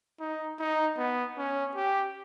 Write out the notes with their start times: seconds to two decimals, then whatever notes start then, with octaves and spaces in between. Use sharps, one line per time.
0.20 D#4
0.59 D#4
0.98 B3
1.37 C#4
1.76 G4